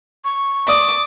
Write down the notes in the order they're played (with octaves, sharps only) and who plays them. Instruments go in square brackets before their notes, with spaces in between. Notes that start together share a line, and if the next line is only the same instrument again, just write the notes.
[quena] C#6
[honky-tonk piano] D5 D#6 [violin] D6